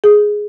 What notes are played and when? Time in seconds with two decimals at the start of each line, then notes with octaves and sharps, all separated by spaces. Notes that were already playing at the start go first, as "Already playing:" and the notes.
0.04 G#4